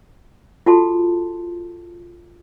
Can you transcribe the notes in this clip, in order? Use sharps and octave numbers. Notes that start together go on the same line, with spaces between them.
F4 F#4 A4 A5 C6